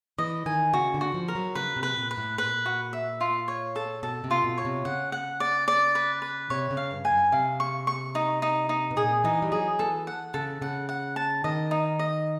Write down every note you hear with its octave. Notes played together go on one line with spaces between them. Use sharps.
E3 D#5
D#3 G#5
C#3 F#4
D3
F#4
F3
A#4
F#3
C#3 B4
C3
B4
A#2
B4
A2
A#2 B4
F#4
E5
F4
C#5
A4
B2 A4
C3
F4
B2
C#5
C3
C#3 F#5
F#5
D5
D5
B4
B4
C3 C#5
C#3
F5
G2
G#5
F#2
C3 F5
C#6
C#6
D#4
D#4
D#4
B2
A#2 G#4
E3 D#4
G3
F#3 G#4
E3 A4
F#5
C#3 A4
C#3 F#5
F#5
A5
D#3 D#5
D#4
D#5